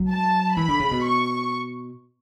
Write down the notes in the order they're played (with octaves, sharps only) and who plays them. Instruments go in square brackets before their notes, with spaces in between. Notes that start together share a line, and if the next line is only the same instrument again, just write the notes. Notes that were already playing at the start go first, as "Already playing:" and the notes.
Already playing: [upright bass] F#3
[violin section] A5
[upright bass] E3 [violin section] B5
[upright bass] D3
C#3
B2
[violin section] C#6